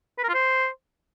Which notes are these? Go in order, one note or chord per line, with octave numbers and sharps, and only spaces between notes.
B4
A#4
F4
C5